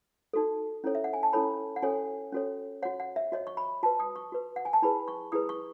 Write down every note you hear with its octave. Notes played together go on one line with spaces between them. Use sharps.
D#4 F#4 A4
C#4 E4 A4 C#5
E5
F#5
G#5
A5
C#4 E4 A4 C#5 B5
F#5
C#4 F#4 A4 C#5 G#5
C#4 F#4 A4 C#5
F#4 C#5 F#5
F#5
E5
F#4 C#5 D#5
C#6
B5
F#4 B4 A5
D#6
C#6
F#4 B4
F#5
G#5
A5
E4 G#4 B4 B5
C#6
E4 G#4 B4 D#6
C#6